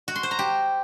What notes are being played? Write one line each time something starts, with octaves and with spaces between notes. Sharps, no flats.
F#4
C6
C5
A#5
G4